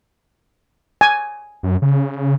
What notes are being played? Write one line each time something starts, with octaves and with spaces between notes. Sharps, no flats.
G#5
F#2
C#3